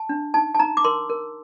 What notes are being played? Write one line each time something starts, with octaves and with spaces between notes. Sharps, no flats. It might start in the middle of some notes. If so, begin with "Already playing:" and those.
Already playing: A5
D4
D#4 A5
A5
D#4 A#5
D6
A#4 C6
A#4